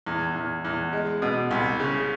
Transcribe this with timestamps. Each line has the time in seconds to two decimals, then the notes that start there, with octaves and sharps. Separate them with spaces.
0.06 E2
0.35 E2
0.65 E2
0.93 G#3
1.22 B2
1.51 C2
1.80 C#3